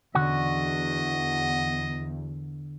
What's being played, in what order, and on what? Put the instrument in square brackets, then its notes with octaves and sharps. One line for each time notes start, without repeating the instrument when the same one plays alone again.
[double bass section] E2 [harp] D3 [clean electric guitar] F#4 [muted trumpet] D#5